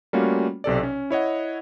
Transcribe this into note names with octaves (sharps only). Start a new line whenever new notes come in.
G3 A3 A#3 C#4 F4 F#4
B1 C3 A4 D5
C#4
E4 C#5 D#5 F#5